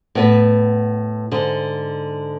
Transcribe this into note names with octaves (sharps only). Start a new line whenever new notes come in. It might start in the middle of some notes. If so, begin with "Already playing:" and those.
A2 B3 B4
G#2 D3